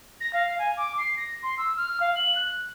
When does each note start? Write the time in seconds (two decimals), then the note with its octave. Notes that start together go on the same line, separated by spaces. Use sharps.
0.20 A#6
0.33 F5
0.58 G#5
0.77 D6
0.98 C7
1.17 A#6
1.43 C6
1.58 E6
1.76 F6
2.00 F5
2.15 F#7
2.35 F#6